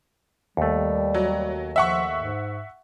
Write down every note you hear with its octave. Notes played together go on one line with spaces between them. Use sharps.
D#2 G3 A3
F#3
F3 E5 F#5 C#6
G#2